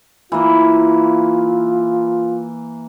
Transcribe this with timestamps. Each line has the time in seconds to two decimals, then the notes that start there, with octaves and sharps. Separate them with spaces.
0.32 E3 A#3 F4